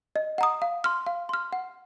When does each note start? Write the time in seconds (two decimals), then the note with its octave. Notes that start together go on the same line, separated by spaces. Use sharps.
0.16 D#5
0.38 F#5 A#5 D#6
0.62 F5
0.84 C6 F6
1.06 F5
1.29 C6 F6
1.53 F#5